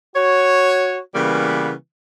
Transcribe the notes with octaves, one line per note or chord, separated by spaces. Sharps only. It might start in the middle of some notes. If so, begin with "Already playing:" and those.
F#4 C#5
C#3 E3 G3 A#3 B3